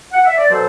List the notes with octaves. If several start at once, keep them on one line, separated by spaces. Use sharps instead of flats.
F#5
E5
D5
B2 F#3 A4 C5